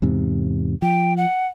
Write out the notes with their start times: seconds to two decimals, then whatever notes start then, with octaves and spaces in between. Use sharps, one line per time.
0.02 E2 G#2 C3
0.82 F3 G5
1.17 F#5